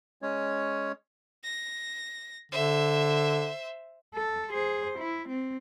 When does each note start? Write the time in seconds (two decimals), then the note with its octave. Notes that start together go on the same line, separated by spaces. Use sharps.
0.22 G#3 C#4 C#5
1.44 A#6
2.52 D3 C5 E5
4.15 A4
4.51 G#4 C5
4.99 E4
5.29 C4